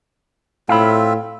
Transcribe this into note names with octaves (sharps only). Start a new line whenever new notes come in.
A2 C4 F4 E5 F5 B5